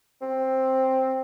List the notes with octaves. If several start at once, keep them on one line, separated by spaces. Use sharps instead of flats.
C4